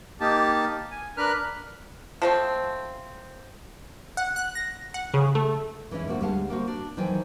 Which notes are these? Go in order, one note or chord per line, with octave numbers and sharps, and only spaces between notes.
A#3 D#4 G4 A5
G#5
D4 A#4 B4 B5 F6 F#6
F3 A3 C4
F#5
F#6
A#6
F#5
C#3
A3
E3 G#3 C#4 E4
D3 A#3 C4 F#4
D2 G3 G#3 F5 F#5 A5
A#3 C4 F#4
D4
D#3 E3 F#3 C5 G5 G#5